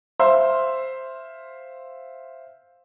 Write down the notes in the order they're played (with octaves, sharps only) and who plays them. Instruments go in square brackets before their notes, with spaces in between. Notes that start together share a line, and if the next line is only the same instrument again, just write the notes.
[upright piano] C5 E5 F5 C6